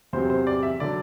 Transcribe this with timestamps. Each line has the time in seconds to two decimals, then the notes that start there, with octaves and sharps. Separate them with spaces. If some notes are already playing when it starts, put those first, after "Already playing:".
0.13 E2 C3 F#3 C5
0.30 C5
0.47 D5
0.63 E5
0.80 D3 F#3 D5